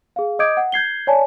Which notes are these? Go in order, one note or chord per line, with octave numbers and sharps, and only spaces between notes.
G#4 F5
D#5 D6 D#6 G6 G#6 D7
F#5
G6 G#6 C7 G7
C#5 D5 G#5 A5